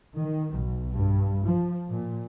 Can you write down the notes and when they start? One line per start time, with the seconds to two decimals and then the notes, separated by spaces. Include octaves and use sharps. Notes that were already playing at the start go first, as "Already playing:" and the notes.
0.17 D#3
0.55 B1
0.95 G2
1.48 F3
1.89 A#2